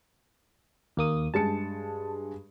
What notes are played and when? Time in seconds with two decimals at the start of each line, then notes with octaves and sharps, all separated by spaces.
0.97 D#2 A#3 D#6
1.34 G2 G#3 A5 C#7